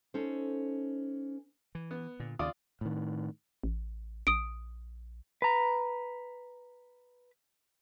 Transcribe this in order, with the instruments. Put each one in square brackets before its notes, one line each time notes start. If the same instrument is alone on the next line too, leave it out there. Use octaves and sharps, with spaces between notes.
[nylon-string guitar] C#4 D#4 A4 C5
[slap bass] E3
[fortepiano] B3
[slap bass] A#2 D3
[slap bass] D#2 C#3 [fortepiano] F4 D5 D#6
[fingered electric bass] A2 D#3
[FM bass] A1
[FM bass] A#1 [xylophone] D#6 D7
[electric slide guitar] B4 A#5